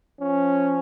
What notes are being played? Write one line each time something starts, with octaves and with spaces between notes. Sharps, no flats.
F3 C#4